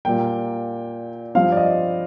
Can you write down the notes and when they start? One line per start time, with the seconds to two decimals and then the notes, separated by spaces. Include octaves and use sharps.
0.05 A#2 G3 A#3 G5
1.35 G2 F3 C4 F5
1.52 D5
1.57 D#5